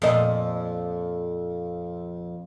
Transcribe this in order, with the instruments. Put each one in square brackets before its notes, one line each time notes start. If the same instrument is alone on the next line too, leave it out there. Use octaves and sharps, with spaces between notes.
[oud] F2 A#2 D#5